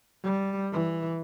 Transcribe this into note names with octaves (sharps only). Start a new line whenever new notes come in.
G3
E3